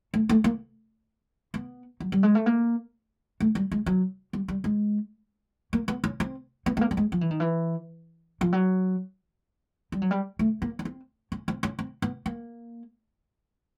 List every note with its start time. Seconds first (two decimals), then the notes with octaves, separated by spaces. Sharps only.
0.14 A3
0.29 A3
0.44 A#3
1.54 B3
2.00 F#3
2.12 G3
2.23 G#3
2.35 A3
2.46 A#3
3.40 A3
3.55 G3
3.72 G#3
3.86 F#3
4.33 G3
4.48 G3
4.64 G#3
5.73 A#3
5.88 B3
6.04 C#4
6.20 C4
6.66 B3
6.77 A3
6.81 A#3
6.91 G3
6.97 G#3
7.12 F3
7.21 E3
7.31 D#3
7.40 E3
8.41 F3
8.53 F#3
9.92 G3
10.02 F#3
10.11 G3
10.39 A3
10.62 A#3
10.79 C#4
10.85 C4
11.32 C#4
11.48 C4
11.63 C#4
11.79 C4
12.02 B3
12.26 A#3